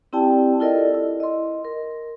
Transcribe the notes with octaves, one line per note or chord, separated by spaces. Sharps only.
C4 E4 G4 D5 G5 A5
E4 F4 A4 A#4 D5 D#5
E4
D#5 C6
A#4